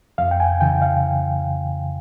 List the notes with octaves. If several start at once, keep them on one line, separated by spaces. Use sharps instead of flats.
F2 F5
G5
G#5
C#3 E3 G5
F5